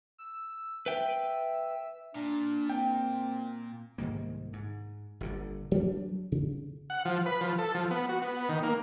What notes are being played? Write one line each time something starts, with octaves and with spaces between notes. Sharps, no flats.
E6
B4 E5 G5
A#2 D4
C4 G5
C2 G#2 D#3 A#3
G#2
G1 A#2 D3
F#3 G3 D4
C#3
F#5
F3
B4
F3
A4
F3
B3
F#4
B3
D#3
A#3